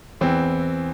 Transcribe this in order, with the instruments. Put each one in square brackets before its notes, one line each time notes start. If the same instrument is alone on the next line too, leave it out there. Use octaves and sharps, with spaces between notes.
[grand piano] E2 E3 C4